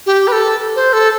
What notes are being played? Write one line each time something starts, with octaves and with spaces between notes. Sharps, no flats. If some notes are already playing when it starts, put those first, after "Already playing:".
G4
B4
A4
C5
A4